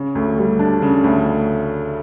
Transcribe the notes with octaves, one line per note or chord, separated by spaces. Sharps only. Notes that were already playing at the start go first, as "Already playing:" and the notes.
Already playing: C#3
D2
G3
D4
C#3
D2